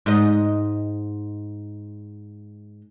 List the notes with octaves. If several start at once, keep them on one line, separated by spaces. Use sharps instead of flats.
G#2 D#5